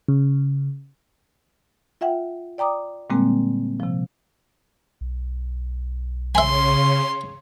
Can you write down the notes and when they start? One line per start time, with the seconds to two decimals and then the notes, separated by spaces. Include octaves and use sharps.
0.08 C#3
2.01 F4 E5 F#5 G5
2.58 D5 G5 A#5 D6 D#6
3.10 A#2 D3 G3 G#3 A#3 C4
3.80 C3 F3
5.01 B1
6.35 C#3 C#4 E5 G#5 C6